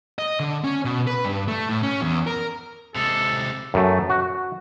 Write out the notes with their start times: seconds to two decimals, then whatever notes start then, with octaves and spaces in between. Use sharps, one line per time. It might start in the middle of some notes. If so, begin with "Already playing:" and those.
0.19 D#5
0.40 D3
0.64 C#4
0.85 B2
1.07 B4
1.25 G2
1.48 A3
1.69 A2
1.83 C#4
2.02 E2
2.27 A#4
2.96 C3 G#3 A4
3.74 F#2 A3
4.10 F#4